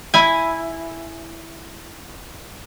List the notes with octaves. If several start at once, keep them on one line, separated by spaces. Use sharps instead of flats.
E4 G#5